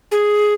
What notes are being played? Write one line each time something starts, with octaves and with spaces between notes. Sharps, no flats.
G#4